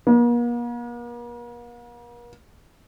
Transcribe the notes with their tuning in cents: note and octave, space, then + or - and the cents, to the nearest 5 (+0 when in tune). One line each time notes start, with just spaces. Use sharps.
A#3 +45